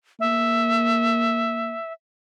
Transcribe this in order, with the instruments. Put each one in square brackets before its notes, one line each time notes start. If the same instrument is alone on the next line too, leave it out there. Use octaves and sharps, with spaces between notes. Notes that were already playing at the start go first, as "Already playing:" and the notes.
[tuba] A#3 [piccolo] E5